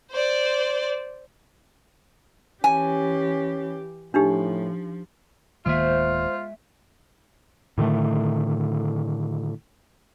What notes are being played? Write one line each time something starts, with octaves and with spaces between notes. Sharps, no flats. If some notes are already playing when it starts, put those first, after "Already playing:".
C5 D5
E3 C#4 G4 G#5
A2 F3 D4 D#4 G4
D1 D#3 G#3 A#3 F4 C5 E5
A2 D3 D#3 A3